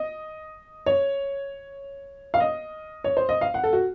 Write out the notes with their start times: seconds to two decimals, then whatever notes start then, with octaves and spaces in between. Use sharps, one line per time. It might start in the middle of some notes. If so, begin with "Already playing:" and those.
Already playing: D#5
0.86 C#5
2.34 F5
2.40 D#5
3.04 C#5
3.17 C5
3.29 D#5
3.41 F5
3.54 F#5
3.64 A4
3.73 F#4